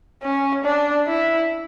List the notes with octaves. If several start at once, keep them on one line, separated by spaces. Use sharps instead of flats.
C#4
D4
E4